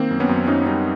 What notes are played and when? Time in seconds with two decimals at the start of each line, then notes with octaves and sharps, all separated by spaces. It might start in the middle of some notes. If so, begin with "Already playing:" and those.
Already playing: D#3 A#3 C4
0.11 F#2
0.20 B3 C#4
0.29 F#2
0.47 F#2 C#4 D#4
0.66 G3 C#4 D#4